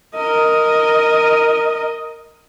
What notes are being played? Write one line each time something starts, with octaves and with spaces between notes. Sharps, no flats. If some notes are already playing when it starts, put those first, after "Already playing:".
A#4 D#5